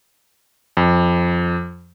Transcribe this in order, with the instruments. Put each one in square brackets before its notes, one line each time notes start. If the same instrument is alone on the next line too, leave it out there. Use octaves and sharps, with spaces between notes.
[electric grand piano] F2